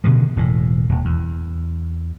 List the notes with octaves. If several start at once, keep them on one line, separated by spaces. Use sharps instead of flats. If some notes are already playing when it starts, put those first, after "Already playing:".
B2 D3 D#3 F3
E1 A2
D#1
E2